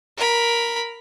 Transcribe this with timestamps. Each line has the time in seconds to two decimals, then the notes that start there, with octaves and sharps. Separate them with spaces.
0.17 A#4 B5